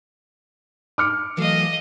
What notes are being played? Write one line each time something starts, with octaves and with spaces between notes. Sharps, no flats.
D6 F6 C#7
E3 F#3 A3 D#5 F5